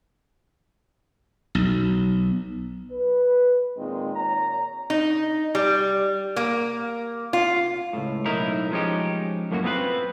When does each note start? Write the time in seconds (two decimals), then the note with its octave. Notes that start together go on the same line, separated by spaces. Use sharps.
1.55 B1
2.90 B4
3.77 A#2 D#3 G#3 C4
4.15 A#2 C#5 A#5
4.90 D#4
5.55 G3
6.36 A#3
7.33 F4
7.93 C#2 A2
8.25 B1 A2 D#4 E4 A#4
8.71 F3 G#3 C#4 D#4 G4
9.51 F#2 A2 A#3 C#4 E4 F#4
9.64 B3 C4 F4 A#4 B4